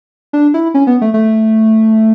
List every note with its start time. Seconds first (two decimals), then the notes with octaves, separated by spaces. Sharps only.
0.33 D4
0.54 E4
0.74 C#4
0.87 B3
1.01 A3
1.14 A3